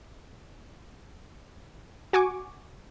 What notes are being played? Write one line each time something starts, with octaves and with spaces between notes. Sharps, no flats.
F#4 G#5 C#6 D6